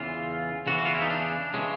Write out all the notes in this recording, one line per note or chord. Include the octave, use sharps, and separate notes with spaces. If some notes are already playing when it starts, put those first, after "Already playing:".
Already playing: E2 C#3 E3 F4
E2 C#3 E3 F#4
F#4
F4
E4
D#4
D4
C#3 E3 G#3